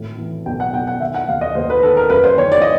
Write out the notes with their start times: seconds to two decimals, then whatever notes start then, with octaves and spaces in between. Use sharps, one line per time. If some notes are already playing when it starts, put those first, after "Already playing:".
Already playing: G#1 A2
0.18 E3
0.46 B1 G5
0.60 F#5
0.73 B1 G5
0.87 F#5
1.00 D#3 E5
1.14 F#5
1.28 D#2 F5
1.41 D#5
1.55 D#2 C5
1.70 B4
1.83 D#3 A4
1.97 A#4
2.10 F#2 B4
2.24 C5
2.37 D#3 C#5
2.52 D5
2.62 D#5